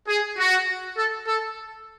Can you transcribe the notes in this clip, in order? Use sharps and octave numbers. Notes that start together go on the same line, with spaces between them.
G#4
F#4
A4
A4